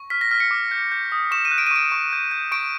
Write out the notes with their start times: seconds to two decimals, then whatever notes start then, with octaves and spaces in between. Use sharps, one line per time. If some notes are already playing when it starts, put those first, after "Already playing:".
Already playing: C#6
0.10 F6 B6
0.21 A#6
0.31 F6 B6
0.40 C#7
0.51 D6
0.71 G6
0.92 G6
1.12 D#6
1.31 C#6 E7
1.45 D#7
1.51 F#6
1.58 D7
1.67 D#7
1.71 C#6 D7
1.92 C#6
2.13 G6
2.31 G6
2.52 C#6 D7